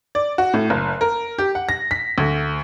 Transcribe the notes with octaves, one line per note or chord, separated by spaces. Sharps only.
D5
F#4
A2
F#1
A#4
G4
F#5
A#6
B6
D2